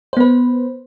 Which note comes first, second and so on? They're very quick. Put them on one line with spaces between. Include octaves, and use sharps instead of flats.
C5 B3 B4